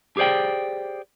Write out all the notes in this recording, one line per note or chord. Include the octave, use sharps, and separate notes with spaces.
G4 G#4 C5 D5 G5